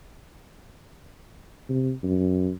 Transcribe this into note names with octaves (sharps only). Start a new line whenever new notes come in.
C3
F#2